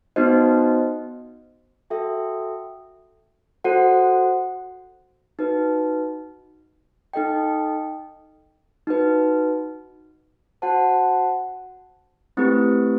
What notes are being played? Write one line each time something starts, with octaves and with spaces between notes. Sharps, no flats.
B3 D#4 F#4 C5 D#5
F#4 A4 E5 G5
F#4 A4 C5 F#5
D#4 F#4 B4
D#4 A4 D#5 G5
D#4 F#4 B4
F#4 C5 F#5 A5
A3 C4 E4 G4 B4